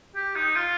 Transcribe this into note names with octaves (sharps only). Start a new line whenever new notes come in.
G4
D#4
F4